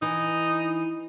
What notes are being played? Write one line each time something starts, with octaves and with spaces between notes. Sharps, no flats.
E3 D#4